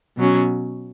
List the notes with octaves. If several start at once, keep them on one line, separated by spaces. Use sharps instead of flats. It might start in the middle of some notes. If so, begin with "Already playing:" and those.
B2 F#3 C#4